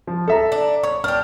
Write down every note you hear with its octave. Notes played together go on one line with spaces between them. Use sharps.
F3
A4 E5 A#5
D4
C#5 C#6
D4 G4 F6